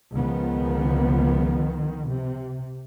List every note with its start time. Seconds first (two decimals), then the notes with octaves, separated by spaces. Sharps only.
0.14 C#2 D#3 F3 B3
2.10 C3